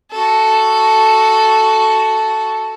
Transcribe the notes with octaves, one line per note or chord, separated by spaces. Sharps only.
F#4 A4